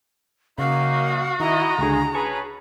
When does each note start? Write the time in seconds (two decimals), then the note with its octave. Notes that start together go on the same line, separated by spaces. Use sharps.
0.58 F#2 C#3 A#3 D#4 F#4 F5
1.40 D#3 E4 D#5 A#5
1.78 C#2 D3 G#4 D#5
2.14 C#4 G#4 B4 G#5 A5 C#6